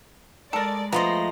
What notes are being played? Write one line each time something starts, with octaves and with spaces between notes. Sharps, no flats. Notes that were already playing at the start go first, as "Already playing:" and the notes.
G#3 A4 A#4 D5 A6
F3 G#3 A3 B3 A#5 C6 A#6